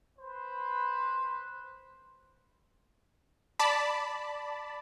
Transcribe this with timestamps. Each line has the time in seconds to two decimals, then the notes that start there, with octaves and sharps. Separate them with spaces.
0.19 B4 C5
3.59 D5 A5 B5